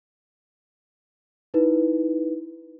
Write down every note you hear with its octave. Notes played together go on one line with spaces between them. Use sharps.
D#4 E4 B4